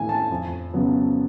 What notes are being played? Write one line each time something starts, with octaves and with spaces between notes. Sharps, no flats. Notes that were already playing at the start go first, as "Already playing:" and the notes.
Already playing: A2 E3 A3 G#5
A5
F2
C#3 F#3 B3